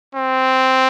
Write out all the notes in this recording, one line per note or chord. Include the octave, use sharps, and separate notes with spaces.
C4